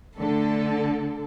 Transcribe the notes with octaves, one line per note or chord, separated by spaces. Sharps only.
D3 A3 A4